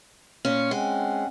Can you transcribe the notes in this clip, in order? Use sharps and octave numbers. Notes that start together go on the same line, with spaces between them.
A#2 C#4
G#3 C4 C#4 F#5